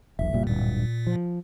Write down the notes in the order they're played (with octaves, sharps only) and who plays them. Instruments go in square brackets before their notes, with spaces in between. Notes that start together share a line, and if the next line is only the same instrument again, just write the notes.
[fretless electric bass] E1 B1 [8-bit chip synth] E5
[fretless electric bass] F#1 A#2 G3
[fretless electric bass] D1 G2 [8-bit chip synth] A#2
[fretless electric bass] F3